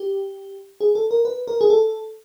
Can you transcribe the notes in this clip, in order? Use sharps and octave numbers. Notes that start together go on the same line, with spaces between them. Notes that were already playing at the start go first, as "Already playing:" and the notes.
Already playing: G4
G#4
A4
A#4
B4
A#4
G#4
A4